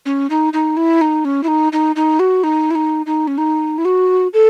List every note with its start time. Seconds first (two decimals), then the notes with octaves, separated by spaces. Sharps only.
0.06 C#4
0.30 D#4
0.53 D#4
0.77 E4
1.01 D#4
1.25 C#4
1.43 E4
1.48 D#4
1.73 D#4
1.96 D#4
2.19 F#4
2.44 D#4
2.71 E4
2.75 D#4
3.06 D#4
3.28 C#4
3.38 D#4
3.78 E4
3.85 F#4
4.34 A4